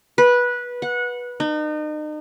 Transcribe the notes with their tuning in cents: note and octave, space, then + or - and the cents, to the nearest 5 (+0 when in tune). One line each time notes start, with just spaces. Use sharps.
B4 -15
F#5 -20
D#4 -35